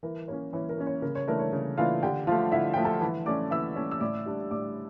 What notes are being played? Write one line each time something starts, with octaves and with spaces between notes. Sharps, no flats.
E3 A#4
A#3 C#4 C#5
E3 C#5
A#4
A#3 C#4
C#5
C#3 A#4
C#5
E3 A3 D4 A#4
C#5
C#3
E3 A3 D4 F4 F5
D3 G4 G5
F3 A3 F4 F5
D3 E4 E5
F3 A3 G5
A4 A5
E3
A3 C#4 D5 D6
E3 E5 E6
A3 C#4
E6
A2 D5 D6
G3 D4
A2 D5 D6